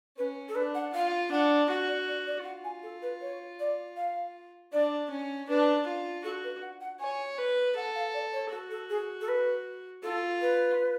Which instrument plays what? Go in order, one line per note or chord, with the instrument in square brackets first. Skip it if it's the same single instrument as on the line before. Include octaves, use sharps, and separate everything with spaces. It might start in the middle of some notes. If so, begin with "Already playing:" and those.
[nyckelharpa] C#4 [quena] B4
[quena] A4
[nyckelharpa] D4 [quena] B4
[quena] F#5
[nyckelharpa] F4 [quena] F5
[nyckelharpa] D4 [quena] F#5
[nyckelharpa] F#4 [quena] F#5
[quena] D5
D5
D5
[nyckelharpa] F4 [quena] F#5
[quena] G#5
A4
B4
C#5
D5
F5
[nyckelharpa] D4 [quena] D5
[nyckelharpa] C#4
[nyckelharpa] D4 [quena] B4
[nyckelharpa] F4
[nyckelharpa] F#4 [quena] A4
[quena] B4
F#5
F#5
[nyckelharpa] C#5 [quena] G#5
[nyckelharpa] B4
[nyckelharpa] A4 [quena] F#5
[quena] F5
D5
C#5
[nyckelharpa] F#4 [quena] A4
[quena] A4
G#4
A4
B4
[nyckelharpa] F4 [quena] A4
[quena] B4